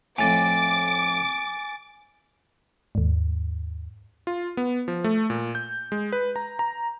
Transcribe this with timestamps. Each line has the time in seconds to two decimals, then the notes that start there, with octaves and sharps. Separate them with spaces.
0.19 F2 A2 G#5 D6 A6
2.95 D#2 G#2
4.27 F4
4.57 B3
4.88 F3
5.04 A3
5.30 A#2
5.55 G6
5.92 G#3
6.12 B4
6.36 A#5
6.59 A#5